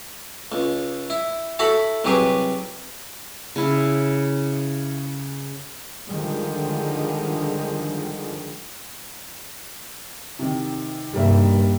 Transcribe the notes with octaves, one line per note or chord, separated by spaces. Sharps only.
C#2
E4
E4 F#4 A4 A5 B5
C2 F#3 G4 G#4 B4
C#3 E4
D3 D#3 F3 G3 G#3
C3 D#3
G2 C3 D#3 G3 A#3 E5